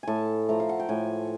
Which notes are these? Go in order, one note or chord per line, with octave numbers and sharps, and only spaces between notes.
A2 G#5 A5
F3 A3 A#5
F5
F#5
G5
A2 G#5